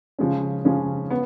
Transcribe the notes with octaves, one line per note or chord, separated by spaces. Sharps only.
C#3 F3 G#3 C#4
C#3 F3 G#3 C#4
B3